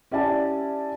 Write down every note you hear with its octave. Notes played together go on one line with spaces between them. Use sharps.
C#4 E4 G4 D5 G#5 A5